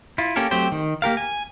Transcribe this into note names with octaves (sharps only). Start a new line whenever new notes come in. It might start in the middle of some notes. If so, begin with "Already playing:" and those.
E4 F4
A#3 C#4 G4 A4 A#4
F#3 A3 C4 G4 C5
D#3
A#3 G4 A#4 F5
G#5